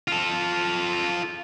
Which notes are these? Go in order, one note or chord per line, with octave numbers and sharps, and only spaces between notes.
F4 A4